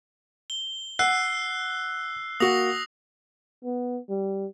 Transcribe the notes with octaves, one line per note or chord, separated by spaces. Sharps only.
G7
F#5 E6 F#6 C7
A#3 F#4 D#6 A#6 F7
B3
G3